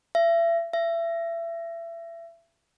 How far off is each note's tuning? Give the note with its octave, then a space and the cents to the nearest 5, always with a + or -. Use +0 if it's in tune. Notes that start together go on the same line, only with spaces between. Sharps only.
E5 +35
E5 +30